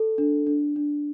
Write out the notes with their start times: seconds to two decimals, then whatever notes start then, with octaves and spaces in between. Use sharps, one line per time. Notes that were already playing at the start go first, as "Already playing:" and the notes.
Already playing: A4
0.18 D4
0.47 D4
0.76 D4